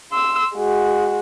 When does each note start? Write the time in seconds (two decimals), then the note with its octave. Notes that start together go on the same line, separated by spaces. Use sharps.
0.12 C6 E6
0.54 G#3 F#4